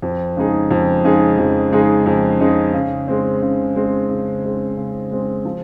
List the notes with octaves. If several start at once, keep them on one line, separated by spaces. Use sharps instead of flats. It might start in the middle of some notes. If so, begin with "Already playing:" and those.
F2
C#3 G#3 D#4 G#4
F2
C#3 G#3 D#4 G#4
F2
C#3 G#3 D#4 G#4
F2
C#3 G#3 D#4 G#4
C#3
G#3 C4
C#3
G#3 C4
C#3
G#3 C4
C#3
G#3 C4
F3